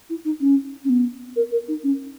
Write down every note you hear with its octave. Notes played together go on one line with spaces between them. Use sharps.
E4
D#4
C#4
C#4
B3
A#4
A#4
D#4
C#4